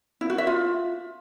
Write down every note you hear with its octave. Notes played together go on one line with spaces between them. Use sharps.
E4
F#4
E5
F4